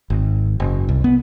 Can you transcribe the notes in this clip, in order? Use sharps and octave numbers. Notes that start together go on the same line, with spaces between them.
G#1
F#1
C2
B3